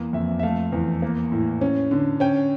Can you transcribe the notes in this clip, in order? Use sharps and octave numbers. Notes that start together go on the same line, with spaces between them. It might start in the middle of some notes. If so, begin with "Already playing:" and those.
Already playing: E2 A#3
F2 E5
E5
A3 F5
E2
A#3
A2
C#4
D3
C#4 G5